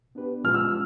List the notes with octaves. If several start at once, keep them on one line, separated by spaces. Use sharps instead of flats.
B3 D4 G4 B4
A#2 F3 G#3 C#4 F4 F6
E6